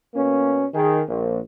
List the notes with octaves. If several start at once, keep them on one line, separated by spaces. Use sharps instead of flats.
B2 A#3 C#4
D#3 G#4
A#1